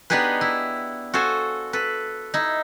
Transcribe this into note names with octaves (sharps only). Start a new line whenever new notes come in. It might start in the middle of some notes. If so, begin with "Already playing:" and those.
B3 D4 D#4 G4 G#4 B4
E4
F#4 A4 C5 F5 G#5
A4 B4
D#4 E4